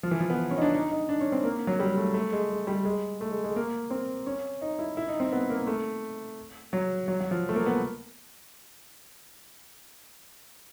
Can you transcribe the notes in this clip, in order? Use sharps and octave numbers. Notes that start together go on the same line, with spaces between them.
F3
E3
F3
B3
C#4
D#4
D4
D#4
D#4
D4
C#4
C4
A#3
F#3
G3
A3
A3
G#3
G#3
G3
G#3
A3
G#3
G#3
A#3
C4
C#4
D#4
E4
E4
D#4
C4
B3
A#3
A3
F#3
F#3
F#3
F3
A3
A#3
B3